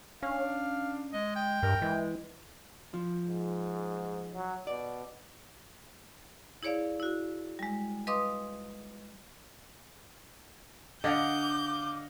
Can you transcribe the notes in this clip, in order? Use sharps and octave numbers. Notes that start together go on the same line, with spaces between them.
C#4 D4 F5
G#3 D#5
G5
G2 A#4
E3 G#3
F3
G#2
F#3
B2 D5
E4 G#4 C#5 D5 F5
E4 F#4
G3 G#3
B4 D#5 F5 C6 D6 D#6
D3 D#5 F5 F#5 D6 G6